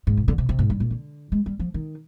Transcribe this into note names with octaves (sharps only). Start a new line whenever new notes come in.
G#2
C3
D3
C3
C3
G#2
G2
A#2
D3
G#3
G3
F3
D#3